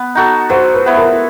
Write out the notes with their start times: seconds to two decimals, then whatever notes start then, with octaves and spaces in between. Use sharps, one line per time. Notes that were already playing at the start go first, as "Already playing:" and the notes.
Already playing: B3
0.15 D#4 F#4 A4
0.50 F#3 C5
0.74 B4
0.86 B3 E4
0.97 A#4